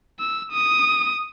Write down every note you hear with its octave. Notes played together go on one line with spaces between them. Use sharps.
E6
D#6